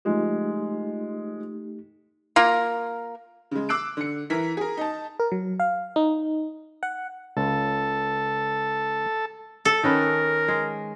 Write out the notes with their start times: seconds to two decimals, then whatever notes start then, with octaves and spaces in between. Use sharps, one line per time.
0.05 F3 G#3 A3 D#4 G4
2.36 A#3 F4 A#4
3.51 C#3 G#3
3.69 D6 E6 F#6 C7 D7
3.97 D3 C#7
4.30 E3 A#4 B6
4.57 G#4 A#4
4.77 D#4 A5
5.20 A#4
5.32 F#3
5.60 F5
5.96 D#4
6.83 F#5
7.37 C#2 A4
9.65 A4
9.83 D#3 C#4 A#4 B4
10.48 G#3